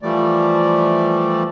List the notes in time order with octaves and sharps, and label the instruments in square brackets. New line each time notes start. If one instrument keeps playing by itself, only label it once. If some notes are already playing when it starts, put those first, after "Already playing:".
[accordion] E3 F3 G3 A3 D5